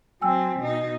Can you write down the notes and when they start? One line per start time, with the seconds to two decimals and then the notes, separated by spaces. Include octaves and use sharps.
0.21 F#3 C4 G5 G#5 E6
0.60 B2 D#4